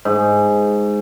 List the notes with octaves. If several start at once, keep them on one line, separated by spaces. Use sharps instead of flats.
G#2